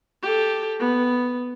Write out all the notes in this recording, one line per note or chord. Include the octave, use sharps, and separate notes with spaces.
G4 A4
B3